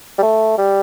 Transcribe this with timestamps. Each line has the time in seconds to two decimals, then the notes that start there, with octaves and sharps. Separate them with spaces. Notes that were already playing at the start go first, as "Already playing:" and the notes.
0.18 G3
0.23 A3
0.58 G3